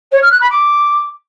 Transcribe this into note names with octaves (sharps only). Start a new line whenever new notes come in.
C#5
F6
F#6
B5
D6